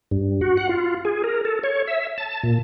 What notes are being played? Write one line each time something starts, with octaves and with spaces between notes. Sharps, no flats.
G2
F#4
F#5
F4
G#4
A#4
A4
C#5
E5
A5
A#2